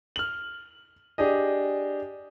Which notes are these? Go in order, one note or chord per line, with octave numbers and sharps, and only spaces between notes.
F6 F#7
D4 G4 G#4 D#5